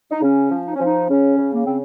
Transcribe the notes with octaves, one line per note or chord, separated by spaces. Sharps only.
D#4
C#3 C#4
F3
D#4
C#4
F3 D#4
C#3 C#4
C#3
A#3
C#3 C4